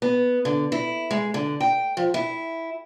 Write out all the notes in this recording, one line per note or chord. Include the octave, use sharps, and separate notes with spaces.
B3
D3
E4
G#3
D3
G5
F3
E4